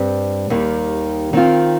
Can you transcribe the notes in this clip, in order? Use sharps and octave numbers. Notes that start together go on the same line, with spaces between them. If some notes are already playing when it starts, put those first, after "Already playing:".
Already playing: G2 G3 C4
D#2 D#3 G3
D#3 C4 F4